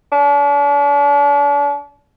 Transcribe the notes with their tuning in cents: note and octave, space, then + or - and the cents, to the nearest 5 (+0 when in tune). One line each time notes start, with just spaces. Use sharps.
D4 -45